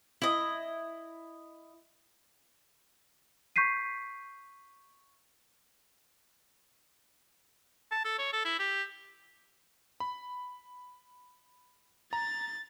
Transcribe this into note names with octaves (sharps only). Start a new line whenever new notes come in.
E4 D#5
C#6 G6 B6 C7 D#7
A5
A4
C#5
A4
E4
G4
B5
A#5 A6